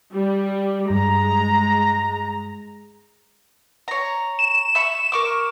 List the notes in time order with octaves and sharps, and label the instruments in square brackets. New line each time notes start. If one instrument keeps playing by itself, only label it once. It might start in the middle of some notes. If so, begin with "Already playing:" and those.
[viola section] G3
[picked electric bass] G2 [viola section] G#3 A#5
[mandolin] C#5 A#5
[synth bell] E7
[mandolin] E5 B5 C#6
A#4 C#6 D6